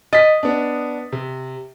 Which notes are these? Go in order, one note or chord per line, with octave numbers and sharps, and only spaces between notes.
D#5 A6 B6
B3 D4
C3